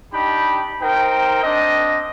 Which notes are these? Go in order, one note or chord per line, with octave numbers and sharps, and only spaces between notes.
D4 D#4 G4 G5 B5
D#4 A#4 C5 G5
C4 D4 D#5